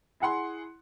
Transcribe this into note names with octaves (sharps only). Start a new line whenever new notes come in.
E4 G#4 F#5 C6